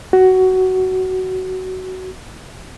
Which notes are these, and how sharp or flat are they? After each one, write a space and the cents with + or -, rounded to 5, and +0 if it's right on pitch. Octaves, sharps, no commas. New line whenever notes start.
F#4 +15